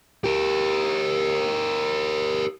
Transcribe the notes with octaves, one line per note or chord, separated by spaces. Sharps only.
G4 A#4